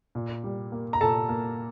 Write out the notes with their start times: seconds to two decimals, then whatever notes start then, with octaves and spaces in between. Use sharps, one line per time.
0.15 A#2
0.43 G3
0.72 A#3
0.93 A#5
1.01 A#2 A4 A5
1.29 A#3